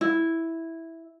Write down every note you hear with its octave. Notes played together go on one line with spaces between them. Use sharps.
E4